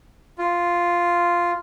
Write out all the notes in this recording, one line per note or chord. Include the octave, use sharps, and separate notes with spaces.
F4